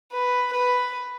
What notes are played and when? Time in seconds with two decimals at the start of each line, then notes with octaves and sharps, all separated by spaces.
0.12 B4
0.53 B4